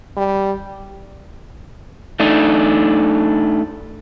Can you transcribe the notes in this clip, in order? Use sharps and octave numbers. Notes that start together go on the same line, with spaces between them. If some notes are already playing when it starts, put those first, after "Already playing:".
G3
A3 D4 D#4